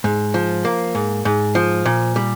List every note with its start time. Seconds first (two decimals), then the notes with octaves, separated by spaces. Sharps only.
0.04 G#2
0.34 F3
0.65 A#3
0.95 G#2
1.25 G#2
1.55 F3
1.86 A#2
2.16 G3